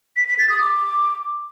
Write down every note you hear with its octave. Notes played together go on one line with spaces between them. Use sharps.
B6
B6
A6
D#6
D6